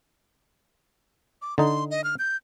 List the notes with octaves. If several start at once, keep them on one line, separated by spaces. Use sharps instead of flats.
D6
D3 D#4 C6
D#5
F6
G6